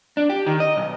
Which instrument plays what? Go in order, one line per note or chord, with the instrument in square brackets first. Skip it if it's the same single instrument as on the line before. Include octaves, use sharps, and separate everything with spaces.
[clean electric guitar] D4
G4
D#3
D#5
B1